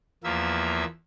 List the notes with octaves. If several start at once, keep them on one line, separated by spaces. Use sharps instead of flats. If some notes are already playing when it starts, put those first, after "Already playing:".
E2 F3 A#3 E5 E6